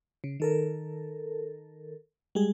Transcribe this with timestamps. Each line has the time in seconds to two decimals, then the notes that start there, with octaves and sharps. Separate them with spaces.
0.24 C#3
0.40 D#3 A4 A#4
2.35 G3 G#3 G#4